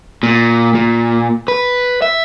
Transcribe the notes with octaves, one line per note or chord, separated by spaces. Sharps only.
A#2
A#2
B4
E5